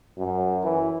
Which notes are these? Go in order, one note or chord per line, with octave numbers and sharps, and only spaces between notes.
F#2
E3